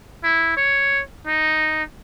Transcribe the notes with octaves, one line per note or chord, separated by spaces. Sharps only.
E4
C#5
D#4